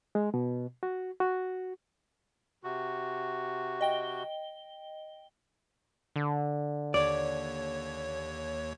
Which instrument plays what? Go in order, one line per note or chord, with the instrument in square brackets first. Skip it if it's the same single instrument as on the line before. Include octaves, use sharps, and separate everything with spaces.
[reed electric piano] G#3
B2
F#4
F#4
[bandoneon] C3 F#4
[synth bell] D#5 G5 G7
[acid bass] D3
[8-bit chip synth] D#2 C#5 [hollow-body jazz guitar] D5